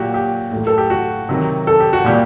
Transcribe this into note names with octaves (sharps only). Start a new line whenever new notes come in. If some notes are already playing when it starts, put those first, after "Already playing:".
Already playing: A#2 F#3 F#4 G4
G4
A2
F#3
A4
G4
F#4
C3 D#3 F#3
A4
G4
F#4
A#2 G3 G4